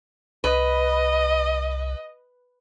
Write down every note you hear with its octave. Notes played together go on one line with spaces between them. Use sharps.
C2 B4 D#5